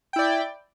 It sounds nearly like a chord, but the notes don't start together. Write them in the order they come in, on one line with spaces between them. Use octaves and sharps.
G5 E4 D5